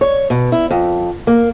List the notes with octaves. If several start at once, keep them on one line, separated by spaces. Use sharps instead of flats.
C#5
B2
E4
F2
A#3